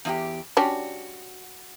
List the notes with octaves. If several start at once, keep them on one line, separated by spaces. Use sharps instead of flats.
E2 F4 G4
G3 C#4 D4 F#4